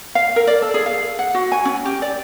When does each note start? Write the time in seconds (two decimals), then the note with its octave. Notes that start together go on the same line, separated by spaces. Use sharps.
0.15 F5
0.36 A#4
0.47 D5
0.62 A4
0.74 G#4
0.86 F5
1.19 F#5
1.34 F#4
1.52 G#5
1.65 C#4
1.85 G4
2.02 D5